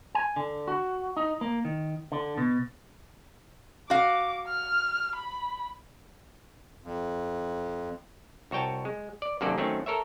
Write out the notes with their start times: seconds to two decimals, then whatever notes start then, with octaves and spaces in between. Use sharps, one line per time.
0.15 G#5
0.36 D3
0.68 F#4
1.17 D#4
1.41 A#3
1.65 D#3
2.12 D3
2.37 B2
3.90 F#4 F5 D6
4.48 F6
5.16 B5
6.83 F2
8.51 C2 F#4 C#5 G5 A5
8.85 G#3
9.22 D5
9.41 F#2 C3 D#3 A#3 A4 D5
9.58 D#3 F#3 A3 C4 C#4
9.86 A4 A#4 C#5 E5